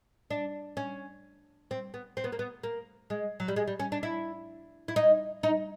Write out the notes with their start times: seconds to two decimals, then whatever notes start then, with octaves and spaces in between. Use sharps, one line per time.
0.30 D4
0.77 C#4
1.71 C4
1.94 B3
2.17 C4
2.24 B3
2.32 A#3
2.39 B3
2.63 A#3
3.10 G#3
3.40 F#3
3.48 G3
3.56 G#3
3.68 G3
3.79 C#4
3.92 D4
4.03 E4
4.88 E4
4.96 D#4
5.43 D#4